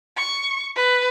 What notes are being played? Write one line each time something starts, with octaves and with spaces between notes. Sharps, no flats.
C#6
B4